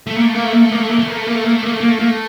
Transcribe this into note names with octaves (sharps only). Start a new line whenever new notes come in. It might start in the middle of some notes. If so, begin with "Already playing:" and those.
A3
A#3
A3
A#3
A3
A#3
A3
A#3
A3
A#3
A3
A#3
A3
A#3
A3
A#3
A3
A#3
A3
A#3
A3
A#3
A3